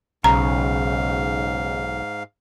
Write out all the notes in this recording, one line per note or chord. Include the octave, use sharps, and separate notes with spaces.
B1 G#2 C#3 F5 A#5